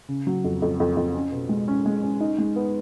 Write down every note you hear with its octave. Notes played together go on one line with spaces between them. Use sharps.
C#3
F#3
F2
F2
F2
F2
C#4
B2
G#3
C#4
G#3
C#4
D#4
G#3
B3